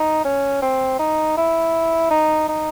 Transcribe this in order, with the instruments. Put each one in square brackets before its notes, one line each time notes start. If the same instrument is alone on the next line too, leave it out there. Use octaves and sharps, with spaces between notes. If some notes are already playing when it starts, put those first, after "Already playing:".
Already playing: [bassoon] D#4
C#4
C4
D#4
E4
D#4
D#4